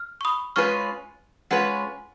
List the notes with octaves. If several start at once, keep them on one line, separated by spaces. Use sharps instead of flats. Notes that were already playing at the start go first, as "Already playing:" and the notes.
Already playing: F6
C#6
B5 D#6
G#3 C#4 F4 G#4 B4 C#6 F6
G#3 C#4 F4 G#4 B4 F#5